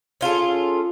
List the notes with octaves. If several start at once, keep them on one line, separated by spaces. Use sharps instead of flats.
C#4 F4 G#4 A4